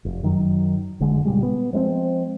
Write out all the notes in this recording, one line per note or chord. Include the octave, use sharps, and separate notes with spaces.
F1
F#2 D#3 F#3
F1 D3 G#3
A#2 C#3 G3 G#3
B3
F3 G#3 A#3 C4